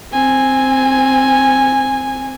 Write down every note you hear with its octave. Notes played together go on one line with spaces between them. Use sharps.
C4 G#5